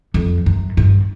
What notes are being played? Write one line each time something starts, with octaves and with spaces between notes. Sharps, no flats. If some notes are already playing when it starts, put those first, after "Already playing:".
F2
F#2
G2